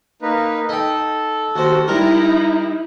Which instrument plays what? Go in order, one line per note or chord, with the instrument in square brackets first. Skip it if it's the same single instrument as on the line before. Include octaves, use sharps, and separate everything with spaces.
[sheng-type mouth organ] A#3 D#4 B4
[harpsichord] D#4 G5 [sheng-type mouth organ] A4
[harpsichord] D#2 C5 [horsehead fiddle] F#4
[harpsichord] G3 A#4 [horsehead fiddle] D#4 E4 [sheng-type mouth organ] A#5